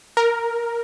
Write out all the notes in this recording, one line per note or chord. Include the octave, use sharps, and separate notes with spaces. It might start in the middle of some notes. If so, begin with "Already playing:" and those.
A#4